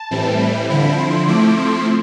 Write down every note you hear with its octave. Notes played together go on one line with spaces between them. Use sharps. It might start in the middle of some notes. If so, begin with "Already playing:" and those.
Already playing: A5
A2 E3 G3 C4 E4
B5
D3 F3 C4 E4 B5
C6
F3 A3 C4 E4 D6
C6